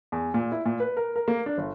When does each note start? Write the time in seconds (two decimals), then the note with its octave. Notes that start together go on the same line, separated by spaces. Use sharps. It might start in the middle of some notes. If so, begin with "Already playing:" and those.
0.12 E2
0.34 A#2
0.52 E4
0.66 A#2
0.80 B4
0.97 A#4
1.16 A#4
1.28 A#3
1.46 D4
1.58 G1